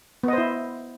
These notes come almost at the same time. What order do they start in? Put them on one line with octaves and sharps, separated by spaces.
B3 D#5 C5 E4